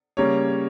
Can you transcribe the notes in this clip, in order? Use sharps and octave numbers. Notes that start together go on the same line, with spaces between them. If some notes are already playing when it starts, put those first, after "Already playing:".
C#3 G3 A#3 C#5